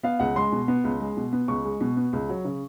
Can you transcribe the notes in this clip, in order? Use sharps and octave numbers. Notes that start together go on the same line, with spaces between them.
B3 F5
C#2 F#5
G#3 C6
B2
B3
C#2
G#3
B2
B3
C#2 C#6
G#3
B2
B3
C#2
F#3
C#3